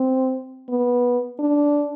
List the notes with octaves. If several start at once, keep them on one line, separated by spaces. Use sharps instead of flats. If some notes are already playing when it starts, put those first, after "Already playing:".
Already playing: C4
B3
D4